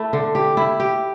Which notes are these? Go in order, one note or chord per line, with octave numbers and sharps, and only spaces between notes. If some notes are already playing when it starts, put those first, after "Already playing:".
Already playing: A3 E4
D3
G4
E4
G4